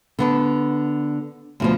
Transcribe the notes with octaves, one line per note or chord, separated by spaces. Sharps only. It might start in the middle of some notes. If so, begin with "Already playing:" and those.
D3 B3 D4
D2 B2 F3